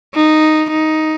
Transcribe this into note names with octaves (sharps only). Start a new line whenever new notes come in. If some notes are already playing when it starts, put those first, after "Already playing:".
D#4
D#4